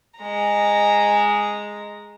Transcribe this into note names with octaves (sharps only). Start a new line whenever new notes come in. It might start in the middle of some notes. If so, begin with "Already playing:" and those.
G#3 A#5